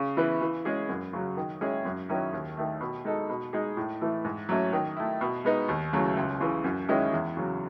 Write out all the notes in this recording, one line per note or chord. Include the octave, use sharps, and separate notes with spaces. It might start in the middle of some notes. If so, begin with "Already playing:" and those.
Already playing: C#3
E3 B3 E4 B4
E3
G#3 C#4 G#4
F#2
C#3 F#3
D#3
G#3 C#4 E4 G#4
F#2
D#3 F#3 C#4 E4
D#2
D#3 A3
B2
G#3 D#4 A4
B2
G#3 D#4 G#4
A2
E3 A3
G#2
F#3 A3 C#4
D#3
A3 E4
B2
G#3 B3 D#4
D#2
C#3 F#3 A3 E4
C#2
C#3 E3
F#2
D#3 G#3 C#4 E4
E2
C#3 F#3